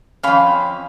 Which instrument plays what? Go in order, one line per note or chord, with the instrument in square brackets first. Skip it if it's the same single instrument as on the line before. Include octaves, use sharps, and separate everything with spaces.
[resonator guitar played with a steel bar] F2 C#4 [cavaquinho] F5 G5 B5